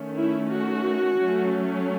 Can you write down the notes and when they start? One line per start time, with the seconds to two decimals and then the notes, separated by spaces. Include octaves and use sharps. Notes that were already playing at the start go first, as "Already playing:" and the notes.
Already playing: D#3 A3 C#4
0.16 E4
0.51 F#4
1.18 F#3 A3 C#4